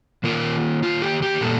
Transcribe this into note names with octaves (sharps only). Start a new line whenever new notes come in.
D#3 A#3 F4 A#4
F4
G4
G4
A#2 G3 A#3 A4